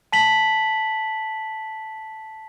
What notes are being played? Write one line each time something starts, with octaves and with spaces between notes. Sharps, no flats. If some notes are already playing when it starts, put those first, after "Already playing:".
A5 B6 F#7